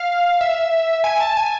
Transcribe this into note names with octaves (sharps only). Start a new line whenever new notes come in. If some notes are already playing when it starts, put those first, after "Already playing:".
Already playing: F5
E5
G#5
A5
G#5